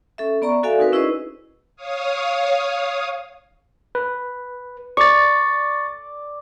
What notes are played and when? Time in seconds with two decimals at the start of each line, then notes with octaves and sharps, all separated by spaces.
0.18 C#4 A4 E5
0.42 B3 D5 A#5 C#6
0.63 F#4 A4 D5 E5 F5 G#5
0.78 C4 D#4 F#4 A#4 B4
0.93 C#4 E4 G#4 B4 C5 D#5
1.76 C#5 F5 D#6
3.95 B4
4.97 D5 C#6 A6